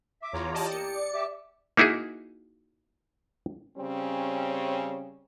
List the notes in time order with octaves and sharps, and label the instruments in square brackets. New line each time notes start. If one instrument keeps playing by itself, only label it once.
[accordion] E5 [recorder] D6
[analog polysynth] E2 [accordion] F4 C#5 A#5
[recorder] G4 [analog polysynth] D5 D#5 A5
[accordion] A#3 [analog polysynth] C#7
[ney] D5 [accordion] D6
[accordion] G4 D6 [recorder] E5
[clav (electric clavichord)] A#3 D#4 E4 F#4 G#4
[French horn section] C#3 G3 C4 C#4